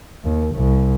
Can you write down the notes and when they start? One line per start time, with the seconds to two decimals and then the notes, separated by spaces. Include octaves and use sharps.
0.24 D#2
0.55 C2